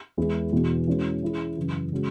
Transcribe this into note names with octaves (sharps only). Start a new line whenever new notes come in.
E2 E3 G#3 E4 G#4
E2 B2 B3 F#4
E3 G#3 C#4 F#4
E3 C#4 E4 G#4
F#2 C#3 E3
C#3 G#3 C#4 F#4